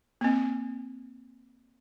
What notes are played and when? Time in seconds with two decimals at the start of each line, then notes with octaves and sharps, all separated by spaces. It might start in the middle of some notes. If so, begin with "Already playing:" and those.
0.21 A#3 C4